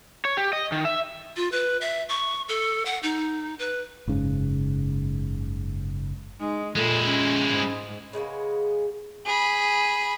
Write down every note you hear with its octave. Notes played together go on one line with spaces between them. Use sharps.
C#5
G4
D#5
D#3
E5
F4
B4
E5
C#6
A4
F#5
D#4
B4
F#1 G#2 C#3
G#3 D#4
A#2 G#3 E4 A4
C#4
G#2
C#3 G#3 A#3 B3
G#4 B5